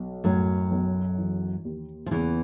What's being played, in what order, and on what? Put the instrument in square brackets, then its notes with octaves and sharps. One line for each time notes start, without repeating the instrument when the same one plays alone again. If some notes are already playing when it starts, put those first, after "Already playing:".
Already playing: [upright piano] B1
[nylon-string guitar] F#2 F#3 [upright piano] A2
[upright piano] B1
E3
D#2
[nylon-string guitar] F3
[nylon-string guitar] E2 E3 [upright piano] C#3